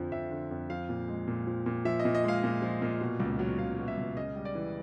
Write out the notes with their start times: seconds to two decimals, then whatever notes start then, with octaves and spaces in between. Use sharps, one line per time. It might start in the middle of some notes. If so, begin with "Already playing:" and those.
Already playing: F2 D3 F3
0.12 F2 E5
0.31 D3
0.51 F2
0.70 F3 F5
0.89 A#2
1.08 G#3
1.28 A#2
1.47 F3
1.66 A#2
1.85 F3 E5
1.99 D#5
2.05 A#2
2.15 D#5
2.24 G#3 F5
2.44 A#2
2.62 F3
2.82 A#2
3.01 B2
3.20 C#2
3.39 F#3
3.58 C#2 F5
3.79 B2
3.88 E5
3.97 C#2
4.17 C#3 D#5
4.36 G3
4.45 D5
4.55 E3